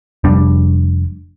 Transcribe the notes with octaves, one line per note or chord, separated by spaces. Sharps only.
F1 G3 D4